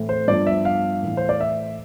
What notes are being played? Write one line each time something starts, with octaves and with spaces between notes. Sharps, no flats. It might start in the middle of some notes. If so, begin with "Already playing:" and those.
Already playing: A2 E3 A3 C4
C5
G2 F3 B3 D5
E5
F5
A2 E3 A3
C5
D5
E5